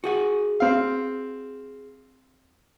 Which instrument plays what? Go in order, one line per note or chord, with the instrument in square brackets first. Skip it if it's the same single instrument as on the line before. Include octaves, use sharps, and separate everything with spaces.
[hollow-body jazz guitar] F#4 G#4 F#5
[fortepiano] C4 F5